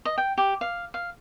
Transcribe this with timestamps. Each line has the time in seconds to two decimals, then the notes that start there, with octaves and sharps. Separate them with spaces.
0.05 D#5
0.18 G5
0.38 G4
0.61 F5
0.94 F5